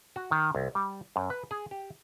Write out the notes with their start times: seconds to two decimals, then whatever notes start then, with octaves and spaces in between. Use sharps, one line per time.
0.16 F#4
0.31 D#3
0.55 C2
0.75 G3
1.16 F#2
1.30 B4
1.51 G#4
1.71 G4